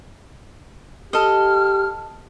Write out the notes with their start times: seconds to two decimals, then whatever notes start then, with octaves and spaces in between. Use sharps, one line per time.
1.13 G4 A4 D#5 F6